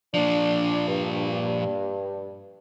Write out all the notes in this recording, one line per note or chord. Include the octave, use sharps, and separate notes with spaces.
A#2 F3 D4
G2